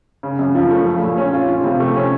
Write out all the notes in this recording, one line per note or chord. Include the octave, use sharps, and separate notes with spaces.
C#3
F#2
F3
A3
A3
A#2
C#4
F4
F3
C3
A3
C#4